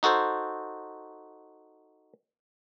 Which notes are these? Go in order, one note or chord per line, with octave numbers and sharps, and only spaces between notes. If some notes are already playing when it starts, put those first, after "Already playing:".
D#4 F#4 A4 C5